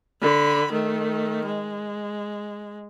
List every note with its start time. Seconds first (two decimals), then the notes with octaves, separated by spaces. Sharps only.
0.21 D3 B5
0.72 D#3 A3
1.47 G#3